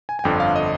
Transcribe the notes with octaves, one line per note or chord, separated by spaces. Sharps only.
G#5
G#5
G1 F2 D3 G5
F5
D#5